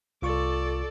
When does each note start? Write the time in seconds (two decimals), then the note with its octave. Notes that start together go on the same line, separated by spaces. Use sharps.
0.22 C2 F4 A4 D5 C#6